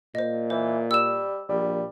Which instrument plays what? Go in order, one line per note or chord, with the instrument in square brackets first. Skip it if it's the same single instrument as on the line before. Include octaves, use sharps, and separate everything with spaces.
[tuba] A#2 [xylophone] C5 D#5
[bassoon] E3 [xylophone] C5
[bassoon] G3 [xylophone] E6 E7
[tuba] A#1 [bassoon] G3